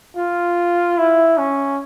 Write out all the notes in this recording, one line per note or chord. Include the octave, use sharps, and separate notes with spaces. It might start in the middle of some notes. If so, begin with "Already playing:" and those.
F4
E4
C#4